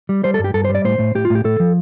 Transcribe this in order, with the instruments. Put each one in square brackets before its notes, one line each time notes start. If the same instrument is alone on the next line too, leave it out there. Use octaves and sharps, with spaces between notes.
[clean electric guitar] G3
G3 C5
A4
G2
G4
G2 A4
C5
G3
D5
A2 C5
A2
A2 G4
F4
A2
G4
A2 A4
F3